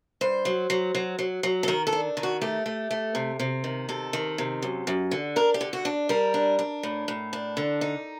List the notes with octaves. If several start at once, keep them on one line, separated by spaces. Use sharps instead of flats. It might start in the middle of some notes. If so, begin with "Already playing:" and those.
G2 C5
F#3
F#3
F#3
F#3
F#3
A4
D#3 A#4
A4
D4
D#3
F#4
A3 G4
A3
A3
C3
C3
D#3
C3 A4
D#3
C3
F#2
F#2
D3
D4 A#4
G4
D3
F#4
D4
G3 A#4
D4
D4
A2
A2
D4
D3
D#4